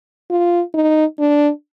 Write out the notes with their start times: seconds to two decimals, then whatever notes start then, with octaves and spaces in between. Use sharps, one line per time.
0.31 F4
0.74 D#4
1.19 D4